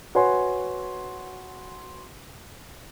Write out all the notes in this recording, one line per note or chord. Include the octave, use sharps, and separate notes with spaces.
F#4 B4 C#5 G#5 C6